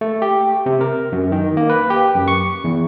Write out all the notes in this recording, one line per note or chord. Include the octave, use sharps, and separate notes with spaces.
A3
G4
C3
A#4
F#2
D#3
A#3
B4
G4
F#2
C#6
E2